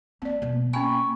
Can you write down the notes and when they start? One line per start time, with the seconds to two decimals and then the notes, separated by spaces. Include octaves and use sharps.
0.22 A#3 C4 D5
0.42 B2 F#3
0.73 A#3 C#4 G5 G#5 B5 C#6